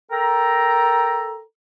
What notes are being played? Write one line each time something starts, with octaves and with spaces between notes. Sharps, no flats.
A4 A#4 G5 A#5